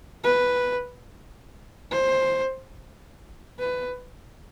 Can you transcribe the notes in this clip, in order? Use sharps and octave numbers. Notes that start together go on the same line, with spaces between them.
B4
C5
B4